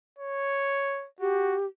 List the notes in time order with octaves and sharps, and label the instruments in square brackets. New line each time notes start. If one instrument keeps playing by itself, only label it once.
[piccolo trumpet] C#5
[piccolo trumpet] F#4 [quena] G4